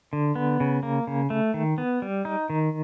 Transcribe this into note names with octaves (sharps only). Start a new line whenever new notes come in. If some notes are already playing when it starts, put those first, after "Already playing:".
D3
B3
C#3
A#3
C#3
A3
D#3
B3
G3
D#4
D#3